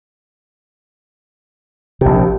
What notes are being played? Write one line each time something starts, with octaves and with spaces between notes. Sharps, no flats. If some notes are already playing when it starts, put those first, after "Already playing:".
A#1 C3 G4